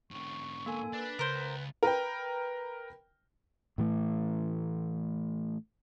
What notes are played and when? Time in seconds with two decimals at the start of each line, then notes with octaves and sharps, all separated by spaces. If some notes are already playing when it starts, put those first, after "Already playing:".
0.11 G#2 D3 C#6
0.66 A#3 A4 G#5
0.93 D4 B4 A6
1.19 C#2 A#4 C5
1.83 A#4 B4 G5
3.78 A2 E3 A3